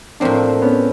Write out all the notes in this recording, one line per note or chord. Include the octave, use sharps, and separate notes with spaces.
A2 F3 A#3 C4 D4
B3 C#4